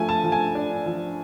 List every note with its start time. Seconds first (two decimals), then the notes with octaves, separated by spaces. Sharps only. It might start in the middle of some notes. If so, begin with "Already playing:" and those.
Already playing: F3 A3 G#5
0.09 A5
0.24 F3
0.32 G#5
0.55 D4
0.86 F3